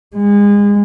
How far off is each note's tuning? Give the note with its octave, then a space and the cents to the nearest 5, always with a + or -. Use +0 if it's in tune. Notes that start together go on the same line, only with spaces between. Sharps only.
G#3 -30